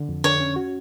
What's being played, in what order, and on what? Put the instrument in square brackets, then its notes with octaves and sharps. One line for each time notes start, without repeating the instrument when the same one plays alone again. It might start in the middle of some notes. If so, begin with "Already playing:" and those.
Already playing: [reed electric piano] D3
F2
[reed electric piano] D3 [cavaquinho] C#5
[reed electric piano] C#4
F#4